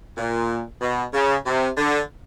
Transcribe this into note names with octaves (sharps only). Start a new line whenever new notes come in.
A#2
B2
C#3
C3
D3